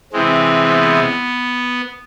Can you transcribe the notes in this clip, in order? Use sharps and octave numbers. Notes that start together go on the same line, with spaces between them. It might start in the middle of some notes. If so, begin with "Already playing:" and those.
C3 E3 G#3 C4
B3